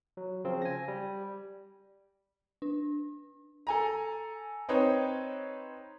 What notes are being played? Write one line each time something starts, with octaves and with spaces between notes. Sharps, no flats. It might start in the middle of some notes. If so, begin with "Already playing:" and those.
F#3
C#3 F3 C4
G#5 A#6
G3
D4
A4 G#5 A#5
C4 D#4 B4 C#5